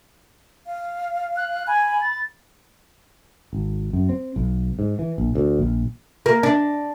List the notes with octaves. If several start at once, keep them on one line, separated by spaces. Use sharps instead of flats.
F5
F#6
G#5 B5
A6
G#1
F#2
C4
B1
G#2
E3
A#1
D2
A#1
A#3
D4